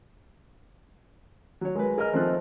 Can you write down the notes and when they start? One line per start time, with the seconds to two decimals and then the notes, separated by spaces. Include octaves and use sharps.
1.61 F#3 C#5
1.75 G#3 A#4 B4
1.98 G#4 A#4 D#5 G#5 A#5 F6
2.13 F3 A3 C4 D#4 A4 F#6